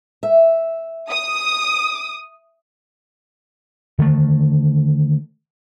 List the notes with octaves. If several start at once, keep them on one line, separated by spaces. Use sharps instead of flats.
E5
D#6
D3 D#3 A3